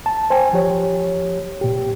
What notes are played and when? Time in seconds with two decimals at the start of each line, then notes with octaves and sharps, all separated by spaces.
0.06 A5
0.30 C5 G5 G#5
0.53 F3 G4 C#5
1.61 A#2 G4